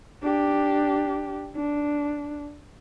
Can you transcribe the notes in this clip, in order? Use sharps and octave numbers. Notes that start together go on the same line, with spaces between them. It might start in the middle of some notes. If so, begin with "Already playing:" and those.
D4 G4
D4